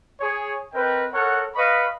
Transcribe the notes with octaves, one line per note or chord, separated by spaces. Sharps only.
G#4 C#5
C4 A#4 B4 D#5 G5
A4 A#4 C#5 F#5
B4 D#5 F5 B5 C#6